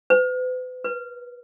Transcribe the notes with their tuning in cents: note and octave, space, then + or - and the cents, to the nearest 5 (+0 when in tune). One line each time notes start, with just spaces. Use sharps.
B4 +40
B4 -25